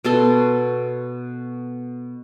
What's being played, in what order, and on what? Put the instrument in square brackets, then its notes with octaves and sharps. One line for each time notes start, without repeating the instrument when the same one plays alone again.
[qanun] B2 F#4 A4 C6